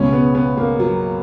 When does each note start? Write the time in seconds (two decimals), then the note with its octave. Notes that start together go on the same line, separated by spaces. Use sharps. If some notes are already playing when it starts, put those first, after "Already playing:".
Already playing: C#2 B2 G#3 C#4
0.13 B3
0.35 B3
0.57 A#3
0.80 F#3